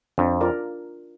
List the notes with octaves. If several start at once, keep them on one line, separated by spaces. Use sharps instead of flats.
F2 D4
F4 A#4 D5